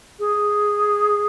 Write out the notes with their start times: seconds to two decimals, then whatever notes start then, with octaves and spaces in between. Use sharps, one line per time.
0.19 G#4